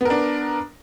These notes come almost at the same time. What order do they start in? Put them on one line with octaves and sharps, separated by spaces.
B3 A#4 D4